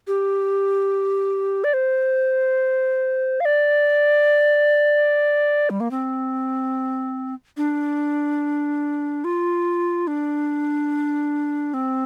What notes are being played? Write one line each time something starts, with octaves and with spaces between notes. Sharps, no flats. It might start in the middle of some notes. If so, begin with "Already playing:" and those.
G4
D5
C5
F5
D5
G3
A#3
C4
D4
F4
D4
C4